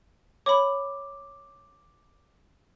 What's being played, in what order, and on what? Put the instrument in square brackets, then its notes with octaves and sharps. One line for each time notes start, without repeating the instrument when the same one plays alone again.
[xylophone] C#5 B5 [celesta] D6